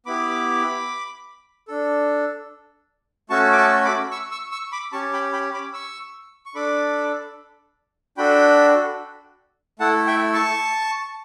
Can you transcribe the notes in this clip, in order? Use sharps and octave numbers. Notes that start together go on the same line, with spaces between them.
B3 E4 G4 B5 D6
D4 A4
A3 C#4 F#4 A4 A5 C#6
D6
A5 C#6
B5 D6
C#6 E6
C#6 E6
C#6 E6
B5 D6
C#4 G4 A5 C#6
G5 B5
G5 B5
B5 D6
C#6 E6
C#6
D4 A4 B5 D6
D4 F#4 A4 G5 B5
A3 E4 A4 F#5 A5
E5 G5
A5 C#6